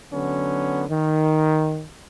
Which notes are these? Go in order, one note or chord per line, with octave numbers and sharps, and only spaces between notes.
D3 F#3 B3 C#4
D#3